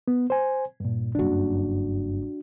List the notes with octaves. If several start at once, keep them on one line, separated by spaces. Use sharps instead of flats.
B3
C5 G#5
G2 A#2
F#1 G2 D4 F#4